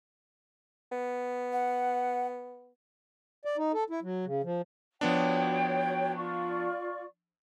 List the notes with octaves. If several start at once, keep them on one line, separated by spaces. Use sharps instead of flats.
B3
F#5
D5
D#4
A4
E4
F#3
C#3
F3
F3 B3 D4 F#4 C#5 G5
F4 D5 C#6